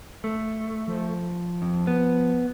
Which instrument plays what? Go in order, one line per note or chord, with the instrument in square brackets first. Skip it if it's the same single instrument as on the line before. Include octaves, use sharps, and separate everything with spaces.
[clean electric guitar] A3
[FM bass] F3
[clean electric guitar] F2
B3